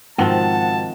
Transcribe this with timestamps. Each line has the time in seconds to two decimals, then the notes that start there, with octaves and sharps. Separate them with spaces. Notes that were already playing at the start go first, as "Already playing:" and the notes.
0.18 G#2 B2 D#3 F3 C4 F#5 A5